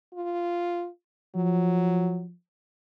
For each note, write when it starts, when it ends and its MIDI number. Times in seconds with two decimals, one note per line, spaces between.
0.14 0.88 65
1.35 2.33 53
1.35 2.22 54